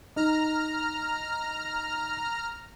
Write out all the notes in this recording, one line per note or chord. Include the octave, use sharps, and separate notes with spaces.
D#4 A#5 F6